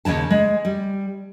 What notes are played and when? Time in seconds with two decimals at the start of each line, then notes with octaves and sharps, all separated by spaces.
0.05 D#2 G#2 C#3 A5
0.31 G#3
0.65 G3